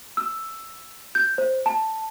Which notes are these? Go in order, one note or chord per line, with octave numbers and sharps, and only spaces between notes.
E6
G6
C5
A5